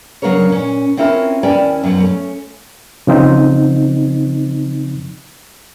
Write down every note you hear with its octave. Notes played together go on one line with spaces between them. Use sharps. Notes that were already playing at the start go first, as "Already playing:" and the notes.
C#3 F#3 A#3 D4 A#4 C#5
A#2 C#4
C4 C#4 E4 F4 A#4
D#2 C#4 E4 D5 G5 G#5
F#2 B2 F#3
A3 C#4
C#3 F3 C4 D#4